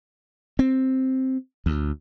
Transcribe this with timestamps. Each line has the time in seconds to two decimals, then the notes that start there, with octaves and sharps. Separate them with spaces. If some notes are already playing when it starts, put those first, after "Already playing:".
0.59 C4
1.66 D2